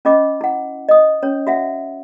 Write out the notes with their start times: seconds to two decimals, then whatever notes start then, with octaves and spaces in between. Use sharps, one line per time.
0.05 C#4 F4 D#5 D6
0.41 E4 F#5
0.89 D#5 D#6
1.23 C#4 C#5
1.47 F#4 E5 F#5